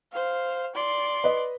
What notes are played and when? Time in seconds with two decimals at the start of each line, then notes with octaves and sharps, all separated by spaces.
0.12 C5 F5
0.75 D5 C6
1.24 B4 D#5